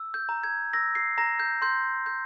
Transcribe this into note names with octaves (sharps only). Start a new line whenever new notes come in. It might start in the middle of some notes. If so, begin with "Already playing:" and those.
Already playing: E6
G6
A#5
G#6
E6 A#6
C7
A#5 A#6
G6
C6 G6
G6